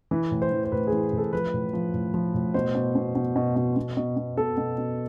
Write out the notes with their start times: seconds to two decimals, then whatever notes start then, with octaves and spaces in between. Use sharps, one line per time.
0.11 E3 B4
0.31 A2
0.42 C5
0.52 E3
0.65 C5
0.72 A2 B4
0.87 G#4
0.92 E3
1.13 A2 A4
1.33 F3 B4
1.54 A2
1.73 F3
1.94 A2
2.14 F3
2.34 A2
2.54 B2 C5
2.75 B2
2.95 B2
3.15 B2
3.36 B2
3.56 B2
3.77 B2
3.97 B2
4.17 B2
4.37 B2 A4
4.57 B2
4.78 B2